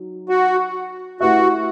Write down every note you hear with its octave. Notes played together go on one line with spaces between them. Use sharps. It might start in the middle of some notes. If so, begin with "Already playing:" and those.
Already playing: F#3 D#4
F#4
A3 E4 F#4 G4 B4 E5